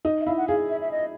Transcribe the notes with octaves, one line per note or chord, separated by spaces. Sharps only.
D#4
E5
E4 F5
F#5
G#4 F5
E5
E5
D#5